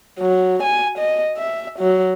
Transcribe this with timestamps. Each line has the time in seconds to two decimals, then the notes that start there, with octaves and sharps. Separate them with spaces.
0.19 F#3
0.63 G#5
0.98 D#5
1.38 E5
1.79 F#3